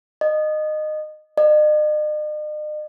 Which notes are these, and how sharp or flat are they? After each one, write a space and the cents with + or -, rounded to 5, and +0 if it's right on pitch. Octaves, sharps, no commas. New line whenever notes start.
D#5 -20
D#5 -45